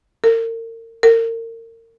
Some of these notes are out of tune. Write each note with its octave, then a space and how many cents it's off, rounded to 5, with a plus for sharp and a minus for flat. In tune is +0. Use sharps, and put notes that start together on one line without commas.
A#4 -40
A#4 -35